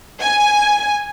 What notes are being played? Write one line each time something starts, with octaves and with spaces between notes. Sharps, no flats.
G#5